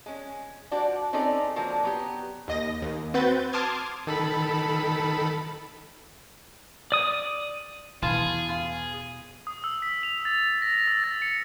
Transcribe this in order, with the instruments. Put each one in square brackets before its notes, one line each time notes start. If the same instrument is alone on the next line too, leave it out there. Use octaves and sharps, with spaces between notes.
[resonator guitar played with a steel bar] G#3 C#4
F3 D4 F#4 D5
C4 C#4 D#4 G#4 A4 D5
D3 F3 F#3 A#3
F#3 B3 G4
[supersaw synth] D#2 D#5 A#6
D#2
C4 F#4 B4 G6 A6
A5 C6 D6 D#6 F6 G#6
[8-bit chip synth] D#3 A4 B5
[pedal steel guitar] D5 D#6
[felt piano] E2 B5 [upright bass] B2 [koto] F4 A5 [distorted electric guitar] G#4
[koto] F4
[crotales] D#6
E6
B6
F7
A6
A#6
E6
A6
C#7